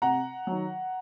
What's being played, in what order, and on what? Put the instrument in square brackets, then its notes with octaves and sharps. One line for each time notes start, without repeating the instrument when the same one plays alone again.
[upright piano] C3 F#5 A#5
D#3 F#3